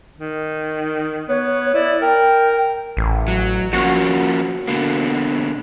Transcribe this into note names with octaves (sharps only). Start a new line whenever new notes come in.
D#3
B3 C#5
E4 D5
A#4 G5
A1
F#3
F3 A#3 C#4 F#4
B2 D3 A#3